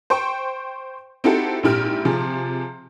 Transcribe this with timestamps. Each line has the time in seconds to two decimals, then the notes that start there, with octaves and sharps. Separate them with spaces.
0.10 C5 G5 C#6
1.24 C4 D#4 E4 F#4 G4 A4
1.63 A#1 G#2 E4 G4 F6
2.05 C3 F3 G#4